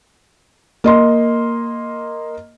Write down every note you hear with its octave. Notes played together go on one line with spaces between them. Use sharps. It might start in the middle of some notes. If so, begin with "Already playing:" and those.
A#3 D#5 C6